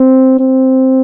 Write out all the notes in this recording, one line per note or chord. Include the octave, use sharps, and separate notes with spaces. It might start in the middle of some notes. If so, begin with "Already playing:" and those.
Already playing: C4
C4